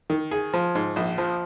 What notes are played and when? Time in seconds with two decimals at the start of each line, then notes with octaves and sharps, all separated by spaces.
0.10 D#3
0.31 G#4
0.54 F3
0.75 G#2
0.96 A#1
1.18 F3